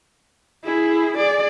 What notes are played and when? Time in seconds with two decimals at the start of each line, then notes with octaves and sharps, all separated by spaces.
0.64 E4 G#4
1.17 G#4 D5